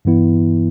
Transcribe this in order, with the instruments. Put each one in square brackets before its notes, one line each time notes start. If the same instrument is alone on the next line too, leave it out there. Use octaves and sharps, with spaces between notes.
[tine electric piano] G2 E3 B3 E4